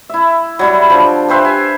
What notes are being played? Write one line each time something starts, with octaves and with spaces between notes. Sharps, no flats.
E4 E5
F#3 G3 E4
F3 D4
G4 B4 C5 E5
G#5